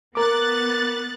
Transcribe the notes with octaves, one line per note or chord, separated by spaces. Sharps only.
B3 A#4 D6 F#6 A6